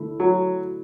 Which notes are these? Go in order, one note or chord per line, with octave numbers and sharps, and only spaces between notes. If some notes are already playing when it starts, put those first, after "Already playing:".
Already playing: D3 A3 E4
F#3